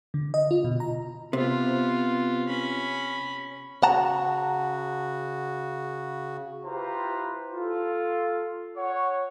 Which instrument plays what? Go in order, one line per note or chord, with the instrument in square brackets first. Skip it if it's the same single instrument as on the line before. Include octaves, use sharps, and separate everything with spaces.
[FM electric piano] D3
D#5
F4
B2
A#5
[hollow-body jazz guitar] C3 [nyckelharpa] B3 F4
[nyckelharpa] C#4 B5
[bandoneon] C#3 F#4 [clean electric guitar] F#5 A5 A#5
[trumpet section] E4 F4 G4 B4 C5 A#5
F4 A4
C#5 F#5